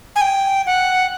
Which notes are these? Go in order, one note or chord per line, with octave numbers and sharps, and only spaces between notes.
G#5
G5
F#5